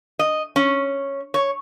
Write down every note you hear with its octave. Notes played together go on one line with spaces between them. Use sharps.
D#5
C#4
C#5